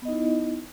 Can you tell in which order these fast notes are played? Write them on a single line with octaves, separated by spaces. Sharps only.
B3 D#5 D#4 E4